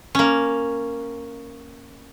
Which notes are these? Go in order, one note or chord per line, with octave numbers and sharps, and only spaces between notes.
A#3 C#4